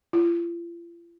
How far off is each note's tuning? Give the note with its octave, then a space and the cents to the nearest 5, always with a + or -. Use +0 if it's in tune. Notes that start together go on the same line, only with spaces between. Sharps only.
F4 -40